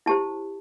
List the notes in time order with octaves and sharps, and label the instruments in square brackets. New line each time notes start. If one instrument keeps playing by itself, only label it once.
[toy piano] E4 G4 C5 A5